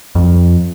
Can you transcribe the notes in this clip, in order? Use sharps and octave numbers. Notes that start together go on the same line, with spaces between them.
F2